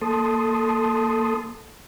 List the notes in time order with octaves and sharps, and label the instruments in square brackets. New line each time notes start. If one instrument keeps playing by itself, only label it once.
[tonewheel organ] A#3 A4 A5 C6 D#6